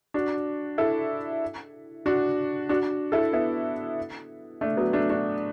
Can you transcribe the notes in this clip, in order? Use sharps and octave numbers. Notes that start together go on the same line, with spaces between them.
D4 F#4
E4 A4
D4 F#4
D4 F#4
E4 A4
B3 E4
A3 D4
F#3 B3
A3 D4
D4 F#4